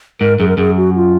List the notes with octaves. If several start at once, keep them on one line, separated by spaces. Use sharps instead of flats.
G#2 A#4
F#2 G#4
A#4
F#2 G#4
F#4
F4